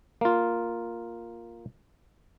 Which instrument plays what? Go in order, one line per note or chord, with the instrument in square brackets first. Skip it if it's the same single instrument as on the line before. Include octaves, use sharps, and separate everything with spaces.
[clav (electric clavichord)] A#3 F4